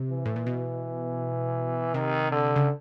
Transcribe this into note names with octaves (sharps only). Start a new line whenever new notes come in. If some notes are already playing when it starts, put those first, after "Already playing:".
Already playing: C3
E3
A2
A#2
B2
C3 D#3
D3
C#3